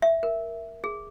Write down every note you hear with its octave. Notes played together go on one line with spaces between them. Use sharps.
E5
A#4
G#4